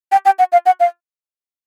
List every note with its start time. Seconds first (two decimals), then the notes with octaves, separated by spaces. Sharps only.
0.12 G5
0.25 G5
0.39 F#5
0.52 F5
0.66 F#5
0.80 F5